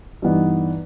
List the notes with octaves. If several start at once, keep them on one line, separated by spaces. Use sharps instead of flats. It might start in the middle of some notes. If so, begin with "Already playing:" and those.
G2 E3 B3 D#4